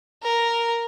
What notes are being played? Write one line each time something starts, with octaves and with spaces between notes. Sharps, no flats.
A#4